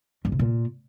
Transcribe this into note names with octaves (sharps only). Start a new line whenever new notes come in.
G2
C3
A#2